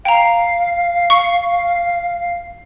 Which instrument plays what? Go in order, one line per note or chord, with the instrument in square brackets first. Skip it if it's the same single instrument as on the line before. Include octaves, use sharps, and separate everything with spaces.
[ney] F5 [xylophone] G5 A#5
[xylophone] C#6 C#7